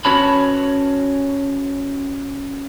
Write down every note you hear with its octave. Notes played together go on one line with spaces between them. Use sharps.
C#4 F#4 B4 C#5 A5 B5